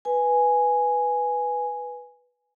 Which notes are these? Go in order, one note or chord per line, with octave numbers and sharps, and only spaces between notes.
B4 G#5